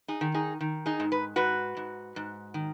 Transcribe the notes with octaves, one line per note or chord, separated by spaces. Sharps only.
D#4 G#4
D#3
D#4 G#4
D#3
D#4 G#4
G#2
B4
G#2 F#4 B4
G#2
G#2
D#3